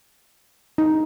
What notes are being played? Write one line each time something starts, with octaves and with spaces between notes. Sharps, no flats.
D#4